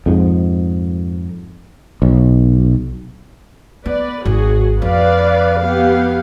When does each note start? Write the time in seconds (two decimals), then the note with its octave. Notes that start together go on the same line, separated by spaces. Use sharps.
0.06 F2 G#2
2.02 B1
3.86 B3 B4 D5
4.26 G#1 F#4 G#4
4.82 F2 B4 D5 F5
5.61 B3 G4 F5